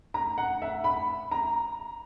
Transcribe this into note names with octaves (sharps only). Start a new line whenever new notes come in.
A#5
F#5
E5
B5
A#5